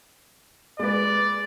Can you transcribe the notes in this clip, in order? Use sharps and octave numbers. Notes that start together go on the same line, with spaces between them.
G#3 B4 D5